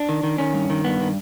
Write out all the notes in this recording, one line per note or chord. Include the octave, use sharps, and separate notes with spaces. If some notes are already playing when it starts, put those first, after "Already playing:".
Already playing: D4
D#3
D#3
D#3 C#4
G2
D#3
G2 B3
D#3